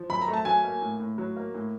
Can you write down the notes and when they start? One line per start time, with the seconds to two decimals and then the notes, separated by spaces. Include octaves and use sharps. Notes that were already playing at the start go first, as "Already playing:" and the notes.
Already playing: F3
0.10 F#2 B5
0.22 A#5
0.28 A3
0.33 A5
0.45 F#3 G#5
0.64 A#3
0.82 A2
1.00 A2
1.18 F#3
1.36 A#3
1.54 A2